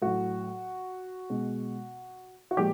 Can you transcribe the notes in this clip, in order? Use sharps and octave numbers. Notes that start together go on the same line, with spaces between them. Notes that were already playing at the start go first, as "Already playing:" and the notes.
A2 F#3 F#4
B2 G#3
F#4
A#2 F3 G#3 G4